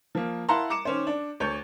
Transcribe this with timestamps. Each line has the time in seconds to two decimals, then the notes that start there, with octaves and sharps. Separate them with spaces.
0.15 F3 A#3
0.49 E4 F5 F#5 A5 A#5 C6
0.70 A#5 D6 C#7 E7
0.85 D#3 C#4 C5
1.07 D4
1.40 D2 C#5 G6